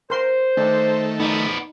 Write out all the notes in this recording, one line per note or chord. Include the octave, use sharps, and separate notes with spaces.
A#4 C5 C6
D#3 A3 D4
F3 B3 D#4 D5